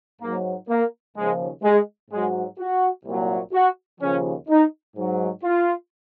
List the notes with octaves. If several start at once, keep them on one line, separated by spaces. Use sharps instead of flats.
G#2 F#3 A#3
A#3
D#2 C#3 F3 G#3
G#3
G#2 F#3 G#3
F#4
C2 A#2 F#3
F#4
D#2 C#3 F3 C#4
D#4
G#2 F#3
F4